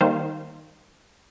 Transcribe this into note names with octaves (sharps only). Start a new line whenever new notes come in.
D#3 G3 A#3 C5 F5